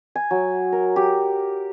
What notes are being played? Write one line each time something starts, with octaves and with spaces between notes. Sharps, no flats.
G#5
F#3
A#4
G4